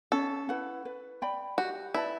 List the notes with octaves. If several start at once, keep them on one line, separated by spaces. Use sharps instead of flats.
C#4 A4
E4 B4 F#5
B4
D5 G5 B5
F#4 G4
E4 B4 D5 A5